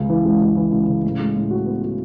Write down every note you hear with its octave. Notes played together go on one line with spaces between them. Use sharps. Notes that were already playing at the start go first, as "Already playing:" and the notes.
Already playing: C#2 C#3
E3
C#2
C#2
E3
C#2
C#3
A2
G#3
A2
F#4
B3
F#4